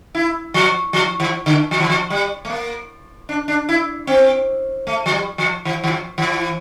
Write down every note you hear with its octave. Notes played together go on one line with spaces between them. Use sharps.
E4
F3
F3
E3
D3
F3
E3
F3
G3
A3
A#3
D4
D4
E4
C4
A3
F3
G3
F3
E3
E3
F3
E3